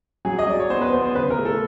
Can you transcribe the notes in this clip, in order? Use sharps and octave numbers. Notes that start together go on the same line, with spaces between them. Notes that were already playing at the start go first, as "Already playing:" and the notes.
F#3 G#4
D#5
F#3 D5
C#5
B3 C5
B4
B3 C5
C5
C#3 B4
A#4
A3
A4